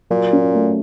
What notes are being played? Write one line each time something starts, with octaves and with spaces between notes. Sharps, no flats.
A#2 F#3
C#4
A3